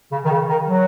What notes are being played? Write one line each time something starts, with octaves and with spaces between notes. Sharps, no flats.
C#3
D#3
C#3
D#3
F#3